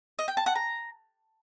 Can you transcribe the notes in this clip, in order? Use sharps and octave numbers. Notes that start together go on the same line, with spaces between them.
D#5
G5
A5
F#5
A#5